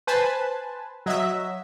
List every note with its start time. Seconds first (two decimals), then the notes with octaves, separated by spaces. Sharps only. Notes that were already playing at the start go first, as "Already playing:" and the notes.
0.07 B4 C5 G#5 A5
1.06 F#3 D#5 E5